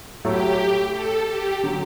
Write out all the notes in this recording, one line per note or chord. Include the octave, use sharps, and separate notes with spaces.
A2 F#3 A3 G4
A4
G4
D3 F#3